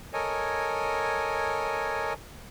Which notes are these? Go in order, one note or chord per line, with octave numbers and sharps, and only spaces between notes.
A4 A#4 C#5 D#5 G#5